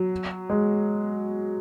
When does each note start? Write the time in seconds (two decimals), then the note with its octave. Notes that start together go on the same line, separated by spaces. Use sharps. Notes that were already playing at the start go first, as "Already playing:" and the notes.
Already playing: F#3
0.50 G#3